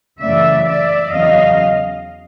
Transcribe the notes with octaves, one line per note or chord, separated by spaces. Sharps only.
F#2 C#3 E3 A3 D5 E5
D5 E5
E2 C#3 F#3 D#5 F5